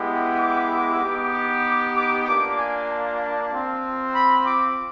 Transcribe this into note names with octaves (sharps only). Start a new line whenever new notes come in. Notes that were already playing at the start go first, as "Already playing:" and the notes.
Already playing: G#3 B3 E4 G4
D6
B3 D#4 G4
D6
D6
A#3 D4 F4 D6
G#5
A5
C4 F4
B5
D6